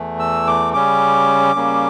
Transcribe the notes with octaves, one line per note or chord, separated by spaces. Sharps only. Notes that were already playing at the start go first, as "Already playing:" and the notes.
Already playing: E2 E3 A3
E6
D6
C#3 G3 C#4 D6
C#3 G3 A#3 C#4